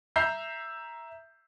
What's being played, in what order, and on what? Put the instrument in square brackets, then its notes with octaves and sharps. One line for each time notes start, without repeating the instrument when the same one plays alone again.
[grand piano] E5 A#5 G6 C7